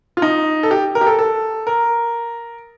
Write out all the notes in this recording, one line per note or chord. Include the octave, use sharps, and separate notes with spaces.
F4
D#4
A4
G4
A#4
G4
A4
A4
A#4